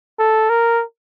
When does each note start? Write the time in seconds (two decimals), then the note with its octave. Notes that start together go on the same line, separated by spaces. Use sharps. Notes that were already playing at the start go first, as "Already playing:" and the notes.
0.19 A4
0.50 A#4